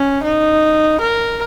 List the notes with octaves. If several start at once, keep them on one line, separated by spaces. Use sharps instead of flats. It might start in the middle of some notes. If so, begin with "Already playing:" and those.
Already playing: C#4
D#4
A#4